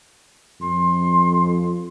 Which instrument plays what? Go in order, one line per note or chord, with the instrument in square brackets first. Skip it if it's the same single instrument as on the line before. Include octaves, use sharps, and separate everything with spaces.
[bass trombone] F2 [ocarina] C6